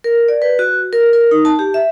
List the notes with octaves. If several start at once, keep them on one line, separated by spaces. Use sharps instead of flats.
A#4
D5
B4
F#4
A#4
A#4
D#4
A5
G4
E5